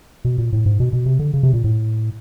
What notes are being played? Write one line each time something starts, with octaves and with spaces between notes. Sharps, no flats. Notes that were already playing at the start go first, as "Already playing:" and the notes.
B2
A#2
A2
G#2
B2
B2
C3
D3
C#3
C3
A#2
A2